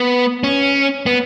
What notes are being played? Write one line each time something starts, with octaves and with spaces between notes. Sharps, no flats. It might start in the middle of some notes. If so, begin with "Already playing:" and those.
Already playing: B3
C#4
B3